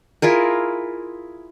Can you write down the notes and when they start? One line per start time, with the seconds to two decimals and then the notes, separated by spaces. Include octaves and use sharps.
0.22 E4 F4 G#4 A#4